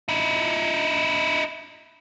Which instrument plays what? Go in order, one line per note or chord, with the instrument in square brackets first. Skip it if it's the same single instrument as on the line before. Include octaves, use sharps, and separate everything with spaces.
[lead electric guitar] D#4 E4